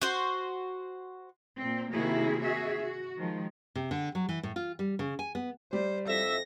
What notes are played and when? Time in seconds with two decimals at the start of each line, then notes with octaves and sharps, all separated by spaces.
0.02 F#4 C5
1.59 A#2 C4
1.91 C3 D#3 A#3 E4 F#4 G#4
2.41 F#4 G#4 E5
2.81 F#4
3.17 D#3 F3 G#3
3.75 C3
3.91 D3
4.15 F#3
4.29 E3
4.43 A2
4.56 F4
4.79 G3
4.99 C#3
5.19 G#5
5.35 B3
5.73 G3 C5
6.08 F2 E5 A#6